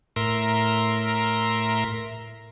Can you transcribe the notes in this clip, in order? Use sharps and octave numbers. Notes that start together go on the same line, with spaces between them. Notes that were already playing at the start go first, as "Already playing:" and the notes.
A2 A#4 E5 A#5 C6